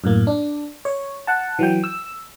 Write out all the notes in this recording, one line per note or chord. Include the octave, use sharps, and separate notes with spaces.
F#2 A2 A#3
D4
C#5
F#5 A5
E3 F#3 G5
E6